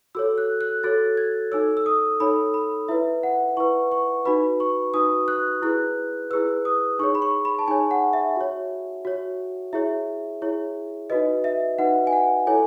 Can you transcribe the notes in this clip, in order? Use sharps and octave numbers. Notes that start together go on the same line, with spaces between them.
F#4 A4 C#5 E6
F#6
F#6
F#4 A4 C#5 A6
G#6
D#4 A4 C#5 E6
E6
D#6
D#4 A4 C#5 B5
B5
E4 B4 E5
F#5
E4 B4 C#6
C#6
D#4 F#4 B4 B5
C#6
D#4 F#4 B4 D#6
F#6
E4 G#4 B4 F#6
E4 G#4 B4 E6
D#6
D#4 G#4 C#5 C#6
B5
C#6
B5
A5
D#4 G#4 C#5 G#5
F#5
E5
F#4 C#5
F#4 C#5
E4 G#4 C#5 E5
E4 G#4 C#5
D#4 F#4 B4 D#5
E5
D#4 F#4 B4 F#5
G#5
F#5
E4 A4 C#5 G#5